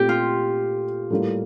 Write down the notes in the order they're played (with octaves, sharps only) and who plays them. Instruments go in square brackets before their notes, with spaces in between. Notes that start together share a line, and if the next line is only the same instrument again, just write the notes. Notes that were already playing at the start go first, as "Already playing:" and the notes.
Already playing: [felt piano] A#2 A3 C4 [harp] G4
[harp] F4
[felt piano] A2 G3 A#3